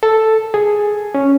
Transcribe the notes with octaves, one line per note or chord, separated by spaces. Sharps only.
A4
G#4
C#4